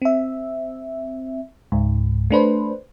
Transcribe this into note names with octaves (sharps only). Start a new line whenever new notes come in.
C4 E5
C#2 G#2
A3 D4 B4 C5